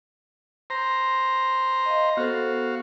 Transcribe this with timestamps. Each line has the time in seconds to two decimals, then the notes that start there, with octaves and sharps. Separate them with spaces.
0.70 C5 A#5
1.86 D#5 F5
2.17 B3 F#4 A4 C5 F5